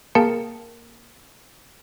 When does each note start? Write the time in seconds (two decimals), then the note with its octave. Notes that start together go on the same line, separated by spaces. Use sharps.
0.15 A#3 G#4 A#4 G5 A5 C#7